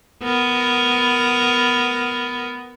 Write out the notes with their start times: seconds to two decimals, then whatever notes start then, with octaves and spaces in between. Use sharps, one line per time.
0.23 B3 A#4